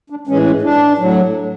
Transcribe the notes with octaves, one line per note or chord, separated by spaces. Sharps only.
D4
A2 E3 G#3 C#4
D4
A2 F#3